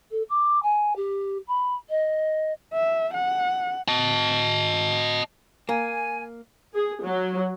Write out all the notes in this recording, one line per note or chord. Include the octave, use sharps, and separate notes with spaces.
A4
D6
G#5
G4
B5
D#5
E5
F#5
D#5 A5
A#3 G#5
G#4
F#3